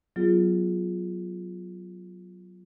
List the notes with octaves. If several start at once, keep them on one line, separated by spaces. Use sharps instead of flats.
F#3 B3 F4 G#4